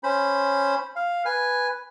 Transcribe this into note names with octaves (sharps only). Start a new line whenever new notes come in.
C#4 C5 B5
F5
B4 G#5